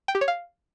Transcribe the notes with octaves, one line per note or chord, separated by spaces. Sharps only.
G5
G4
C#5
F5